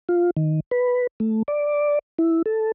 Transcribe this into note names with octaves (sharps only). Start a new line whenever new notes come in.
F4
D#3
B4
A3
D5
E4
A4